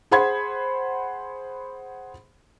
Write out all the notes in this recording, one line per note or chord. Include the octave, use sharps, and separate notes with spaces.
G#4 C5 F#5 B5 C6 G#6